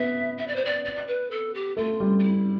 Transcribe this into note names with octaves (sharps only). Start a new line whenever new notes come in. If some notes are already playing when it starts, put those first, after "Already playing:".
Already playing: B3 E5
E5
D5
C5
D5
D5
B4
A4
G4
A3 F4
G3
F4
E4